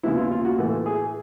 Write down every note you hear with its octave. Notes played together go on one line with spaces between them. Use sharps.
D#2 C#3 F3 G#3 B3 E4
F4
F4
F#4
A2 E3 A3
G#4